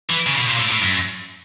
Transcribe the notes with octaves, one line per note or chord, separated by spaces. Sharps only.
E3
C#3
B2
A#2
A2
A2
F#2